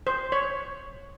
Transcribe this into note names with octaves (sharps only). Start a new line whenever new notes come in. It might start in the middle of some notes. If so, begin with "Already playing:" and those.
C5
C#5